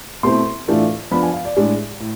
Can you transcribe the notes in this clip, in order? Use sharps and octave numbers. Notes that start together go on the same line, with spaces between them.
B2 A3 C4 E4 C6
A2 E3 A3 D4 F4
F3 B3 D4 B5
G#5
F5
D5
A2 G#3 D4
A2